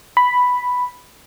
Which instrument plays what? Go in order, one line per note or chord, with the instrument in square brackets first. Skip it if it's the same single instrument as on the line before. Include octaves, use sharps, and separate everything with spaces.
[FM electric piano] B5